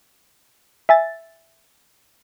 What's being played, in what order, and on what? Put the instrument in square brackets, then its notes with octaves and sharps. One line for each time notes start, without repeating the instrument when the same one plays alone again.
[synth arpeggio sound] E5 G#5 A6